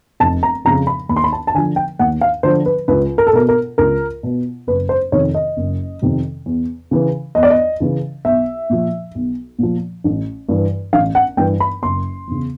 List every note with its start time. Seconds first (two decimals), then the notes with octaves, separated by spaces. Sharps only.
0.20 F1 A5
0.43 A#5
0.65 F2 C#3 F3 A#5
0.87 B5
1.09 D#2 B5
1.16 C6
1.24 B5
1.33 A5
1.47 A5
1.54 D3 G#5
1.58 F3
1.76 G5
1.99 D#2 F#5
2.21 F5
2.43 D3 F3 C5
2.66 B4
2.88 C#2 B4
3.18 A#4
3.27 A4
3.33 B2 A#4
3.49 A#4
3.78 C#2 A#4
4.23 B2
4.67 F#1 B4
4.89 C5
5.12 F2 C3 D#3 C#5
5.35 D#5
5.57 F#1
6.02 F2 C3 D#3
6.46 E2
6.91 C#3 E3
7.35 E2 D#5
7.43 D5
7.50 D#5
7.80 C#3 E3
8.25 B1 E5
8.70 A#2 F3
9.15 B1
9.59 A#2 F3
10.04 A1
10.49 G2 E3
10.93 A1 F5
11.15 F#5
11.37 G2 E3 G5
11.60 B5
11.82 F#1 C6
12.28 E2 C#3